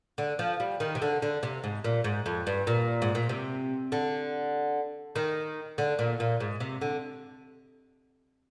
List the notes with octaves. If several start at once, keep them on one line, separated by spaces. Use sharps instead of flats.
D3
F3
G3
D#3
C3
D3
D3
C3
G#2
A#2
G#2
F2
G2
A#2
G#2
A#2
C3
D3
D#3
D3
A#2
A#2
G#2
C3
D3